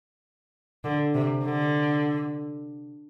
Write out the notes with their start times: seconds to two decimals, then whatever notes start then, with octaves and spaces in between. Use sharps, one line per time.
0.84 D3
1.14 C3
1.44 D3